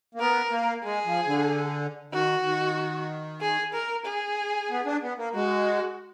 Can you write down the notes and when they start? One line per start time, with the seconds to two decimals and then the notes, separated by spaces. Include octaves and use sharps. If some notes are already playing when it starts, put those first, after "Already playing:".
0.15 A#3
0.19 B3 A#4
0.51 A#3
0.84 G#3 G#4
1.05 F3
1.27 D3
2.13 D#3 F#4
2.44 D#3
3.41 G#4
3.73 A#4
4.06 G#4
4.70 B3
4.86 D4
5.02 B3
5.18 A#3
5.35 G#3 F#4